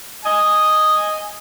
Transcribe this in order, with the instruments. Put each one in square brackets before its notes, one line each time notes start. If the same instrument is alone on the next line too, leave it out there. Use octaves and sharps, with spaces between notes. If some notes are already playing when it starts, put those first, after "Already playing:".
[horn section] D#5 G#5